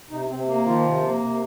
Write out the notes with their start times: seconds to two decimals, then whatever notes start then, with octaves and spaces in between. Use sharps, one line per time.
0.11 C3 D#4
0.30 C3 C4
0.47 A#3
0.66 D#3 F3 F4
0.85 C3
1.03 A#3
1.22 C3